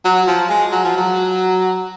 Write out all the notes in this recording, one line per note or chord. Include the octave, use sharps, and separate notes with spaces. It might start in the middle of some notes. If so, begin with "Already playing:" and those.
F#3
F3
G#3
F#3
F3
F#3